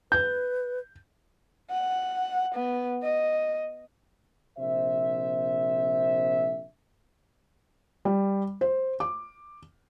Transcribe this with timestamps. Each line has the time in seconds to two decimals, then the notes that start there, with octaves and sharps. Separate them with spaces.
0.12 B4 G6
1.71 F#5
2.55 B3
3.03 D#5
4.58 A#1 C3 C5 E5
8.05 G3
8.61 C5
9.00 D6